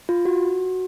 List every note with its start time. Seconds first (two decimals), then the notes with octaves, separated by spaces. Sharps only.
0.09 F4
0.25 F#4